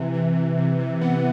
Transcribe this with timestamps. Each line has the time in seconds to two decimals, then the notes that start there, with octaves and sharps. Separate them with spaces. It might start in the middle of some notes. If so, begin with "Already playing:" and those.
Already playing: C3 E3
0.14 E3
0.35 E3
0.57 C3
0.79 C3
1.01 B3